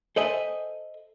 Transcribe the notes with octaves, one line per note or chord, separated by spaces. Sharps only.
A4 C5 D#5 E5 G#5